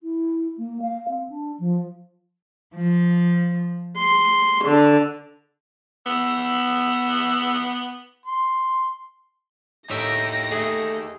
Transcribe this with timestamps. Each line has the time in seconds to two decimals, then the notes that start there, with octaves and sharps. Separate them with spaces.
0.01 E4
0.57 A#3
0.81 F5
1.08 C4
1.29 D4
1.59 F3
2.76 F3
3.97 C6
4.64 D3
6.06 B3 E6
8.26 C6
9.90 A2 D#4 G4 A#4 E5 G5 A#6
10.51 A3 G#4